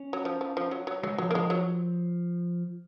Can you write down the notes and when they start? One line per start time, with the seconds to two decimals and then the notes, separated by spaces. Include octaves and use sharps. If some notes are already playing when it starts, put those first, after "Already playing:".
Already playing: C#4
0.13 F#3
0.25 F3
0.41 F3
0.57 F3
0.71 F#3
0.87 F#3
1.03 F#3 G#3
1.18 F3 F#3
1.31 A#3
1.35 F3 G#3
1.50 F#3